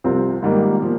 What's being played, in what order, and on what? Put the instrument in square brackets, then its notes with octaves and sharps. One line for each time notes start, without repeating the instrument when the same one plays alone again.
[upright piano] C2 C3 F3 C4 F4
G#2 D#3 G3 A#3
A#2 F3